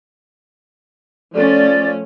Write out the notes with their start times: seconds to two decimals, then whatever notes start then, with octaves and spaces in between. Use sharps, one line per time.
1.34 F3 A3 C#4 D5